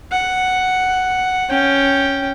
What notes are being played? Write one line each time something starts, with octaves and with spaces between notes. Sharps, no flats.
F#5
C#4 G5